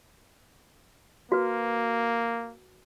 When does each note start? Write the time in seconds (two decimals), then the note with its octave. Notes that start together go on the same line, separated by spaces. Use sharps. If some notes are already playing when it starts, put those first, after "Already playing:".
1.32 A#3 F#4 B4